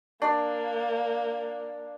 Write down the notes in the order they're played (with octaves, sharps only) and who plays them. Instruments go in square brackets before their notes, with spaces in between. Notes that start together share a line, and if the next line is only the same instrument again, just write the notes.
[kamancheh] A#3 [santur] D4 D5